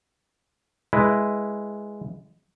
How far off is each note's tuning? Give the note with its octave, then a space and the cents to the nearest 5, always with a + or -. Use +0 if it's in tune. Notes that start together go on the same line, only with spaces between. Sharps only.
G#3 +0 E4 +0 B4 +0